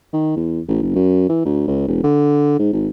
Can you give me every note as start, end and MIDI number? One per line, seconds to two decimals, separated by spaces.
0.13 0.35 51
0.37 0.61 40
0.68 0.81 33
0.83 0.90 30
0.95 1.28 42
1.29 1.42 52
1.45 1.63 38
1.68 1.83 37
1.88 2.00 28
2.04 2.57 50
2.59 2.72 44
2.73 2.88 32